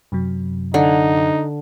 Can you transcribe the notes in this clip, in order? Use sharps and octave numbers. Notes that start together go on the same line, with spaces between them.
F#2 C3 F#3
D3 D#4